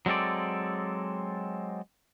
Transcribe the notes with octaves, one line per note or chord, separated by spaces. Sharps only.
F#3 G#3 C4 A4 D5